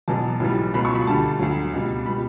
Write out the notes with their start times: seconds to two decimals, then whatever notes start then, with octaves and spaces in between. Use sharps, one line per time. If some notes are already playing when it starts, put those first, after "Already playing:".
0.08 E1 E2 B2 F#3 A5
0.40 B1 A2 E3 G3
0.74 C#2 B2 F#3 B5
0.85 C#6
0.95 B5
1.07 D2 D3 G3 A5
1.39 D2 D3 F#3
1.73 C#2 B2 G3
2.06 B2 G3 B5